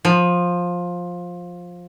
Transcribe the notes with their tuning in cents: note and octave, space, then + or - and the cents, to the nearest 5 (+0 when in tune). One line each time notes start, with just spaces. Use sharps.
F3 +15